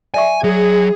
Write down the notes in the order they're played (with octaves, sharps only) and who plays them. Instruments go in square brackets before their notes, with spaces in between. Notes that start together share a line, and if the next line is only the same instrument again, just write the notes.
[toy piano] D5 E5 C#6 [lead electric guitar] G#5
[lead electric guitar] F#3 [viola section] G#4